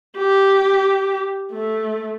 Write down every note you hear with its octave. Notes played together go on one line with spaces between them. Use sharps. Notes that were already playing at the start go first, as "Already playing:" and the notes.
G4
A3